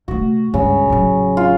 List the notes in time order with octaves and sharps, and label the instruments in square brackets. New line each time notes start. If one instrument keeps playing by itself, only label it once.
[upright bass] C3 A3 [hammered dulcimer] F#4
[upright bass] C#2 G2 [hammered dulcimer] C#3
[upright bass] A1 F#3
[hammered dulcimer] F4